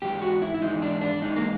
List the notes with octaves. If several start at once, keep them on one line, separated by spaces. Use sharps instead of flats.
G#2 E3 G#3 G4
F#4
E4
E4
G#2 E3 G#3 D#4
D4
D4
G#2 E3 G#3 D#4
A#3